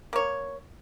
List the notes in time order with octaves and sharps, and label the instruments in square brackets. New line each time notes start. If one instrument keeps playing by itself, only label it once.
[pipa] A#3 C#5